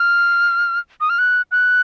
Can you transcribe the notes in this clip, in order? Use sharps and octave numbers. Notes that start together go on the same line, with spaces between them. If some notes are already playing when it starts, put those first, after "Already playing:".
Already playing: F6
D#6
F6
F#6
F#6